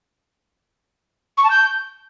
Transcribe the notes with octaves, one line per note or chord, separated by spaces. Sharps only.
C#6
A5
G6